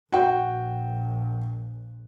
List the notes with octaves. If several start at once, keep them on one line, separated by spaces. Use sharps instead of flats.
A#1 F#4 G5